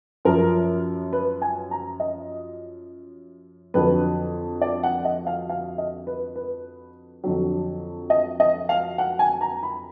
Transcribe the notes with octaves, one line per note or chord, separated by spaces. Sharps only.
F#2 F3 A#4
B4
G#5
A#5
D#5
F2 D3 F#3 B4
D5
F#5
D#5
F5
F5
D#5
B4
B4
F2 D3 F#3
D#5
D#5
F5
F#5
G#5
A#5
B5